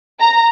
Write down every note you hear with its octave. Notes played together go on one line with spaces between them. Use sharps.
A#5